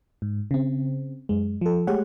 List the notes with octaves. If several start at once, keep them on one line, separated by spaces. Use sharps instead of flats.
G#2
C#3 C4
F#2 G#3
F3 A4
G#3 A3 G4 G#4 C#5 F#5